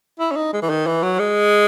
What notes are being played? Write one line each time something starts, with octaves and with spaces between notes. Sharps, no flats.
E4
C#4
D#4
G#3
E3
D#3
E3
F#3
G#3